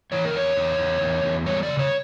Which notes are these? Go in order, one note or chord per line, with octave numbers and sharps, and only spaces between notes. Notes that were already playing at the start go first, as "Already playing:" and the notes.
E3 C#5
A#4
E2 C#5
E2
E2
E2
E2
G3 C#5
C#3 D5
C#5